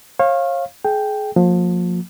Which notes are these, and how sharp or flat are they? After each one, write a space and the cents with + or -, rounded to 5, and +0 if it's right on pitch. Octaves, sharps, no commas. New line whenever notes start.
C#5 -35 F5 +0
G#4 +30 G5 +0
F3 +30 A#3 -20